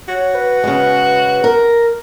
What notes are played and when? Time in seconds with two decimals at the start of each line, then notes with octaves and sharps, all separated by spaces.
0.08 F#4 C#5
0.35 B4
0.64 C#3 G#3
1.44 A#4